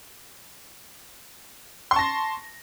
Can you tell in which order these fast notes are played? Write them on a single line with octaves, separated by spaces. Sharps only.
C6 C#6 A5 A#6